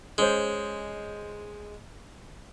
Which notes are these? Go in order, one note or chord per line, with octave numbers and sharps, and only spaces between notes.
G#3 C#4 C5